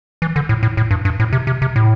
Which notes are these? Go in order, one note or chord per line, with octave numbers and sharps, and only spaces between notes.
E3
D3
A2
A2
A2
G2
G2
A2
C3
C3
C3
A2